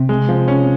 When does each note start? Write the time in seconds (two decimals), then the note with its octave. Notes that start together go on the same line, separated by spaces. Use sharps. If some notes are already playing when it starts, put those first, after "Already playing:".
Already playing: C3
0.09 G#3
0.29 F3
0.48 C#4